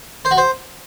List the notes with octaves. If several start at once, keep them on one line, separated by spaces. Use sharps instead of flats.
C5
F#4
C5